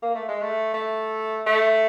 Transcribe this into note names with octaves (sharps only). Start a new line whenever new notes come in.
A#3
A3
G#3
A3
A3
A3